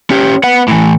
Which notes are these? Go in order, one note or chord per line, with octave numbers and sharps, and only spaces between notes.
C#4 G4
B3 F#5
A2 E3